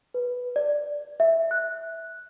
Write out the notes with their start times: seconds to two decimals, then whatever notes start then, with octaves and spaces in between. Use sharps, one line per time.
0.14 B4
0.56 D5
1.20 E5
1.51 F#6